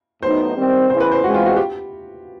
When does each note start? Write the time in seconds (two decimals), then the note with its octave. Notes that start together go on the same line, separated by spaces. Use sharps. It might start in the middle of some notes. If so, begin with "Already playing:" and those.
0.22 A2 F#3 B3 D#4 C5
0.56 D#3 G3 C4
0.89 E2 C#3 E3 C5
1.00 B4
1.12 C5
1.24 C#3 E3 G#3 C4 F#4
1.34 F4
1.46 F#4
1.57 G4